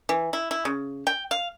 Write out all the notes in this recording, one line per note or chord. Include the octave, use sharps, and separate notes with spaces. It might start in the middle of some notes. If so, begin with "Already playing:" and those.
E3
E4
E4
C#3
G5
F5